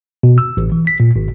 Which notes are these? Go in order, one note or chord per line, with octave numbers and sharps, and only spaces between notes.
B2
E6
A1
E3
B6
A#2
G#1